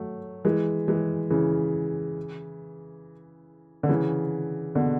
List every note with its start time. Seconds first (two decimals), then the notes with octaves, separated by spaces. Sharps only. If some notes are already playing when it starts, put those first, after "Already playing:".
Already playing: F#3 A3
0.45 E3 G#3
0.88 E3 G#3
1.30 C#3 E3
3.83 D3
3.89 C#3 E3
4.75 B2 D3